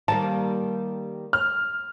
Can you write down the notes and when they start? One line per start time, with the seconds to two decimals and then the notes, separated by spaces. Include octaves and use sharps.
0.08 D#3 G3 A#3 A5
1.33 F6